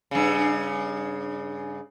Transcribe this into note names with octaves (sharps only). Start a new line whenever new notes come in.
G2 C#3